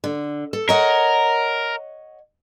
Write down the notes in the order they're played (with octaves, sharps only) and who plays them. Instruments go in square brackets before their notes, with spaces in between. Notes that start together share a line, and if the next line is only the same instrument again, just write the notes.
[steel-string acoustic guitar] D3
A4
[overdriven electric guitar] A#4 [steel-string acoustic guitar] C#5 D#5 F#5